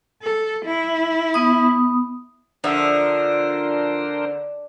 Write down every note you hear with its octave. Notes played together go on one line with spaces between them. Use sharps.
A4
E4
B3 D#6
D3 F3 D4 A#4 C5 E5